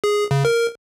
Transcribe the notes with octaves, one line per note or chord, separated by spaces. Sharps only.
G#4
C#3
A#4